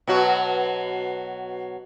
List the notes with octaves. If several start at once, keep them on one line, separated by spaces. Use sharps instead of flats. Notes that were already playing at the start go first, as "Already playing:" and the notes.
B2 F#3 F#4